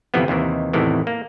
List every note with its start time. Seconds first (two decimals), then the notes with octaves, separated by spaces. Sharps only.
0.14 G1 C3 E3 F3 B3
0.28 D#2 C3 D#3 E3
0.73 E2 A2 C3 D#3 E3
1.07 A#3